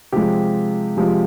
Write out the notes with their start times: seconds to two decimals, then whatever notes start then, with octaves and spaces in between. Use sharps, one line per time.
0.12 C3 F3 G#3 G4
0.97 C3 F3 G#3